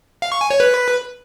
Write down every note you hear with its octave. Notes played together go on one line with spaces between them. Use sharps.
F5
C#6
G#5
C#5
B4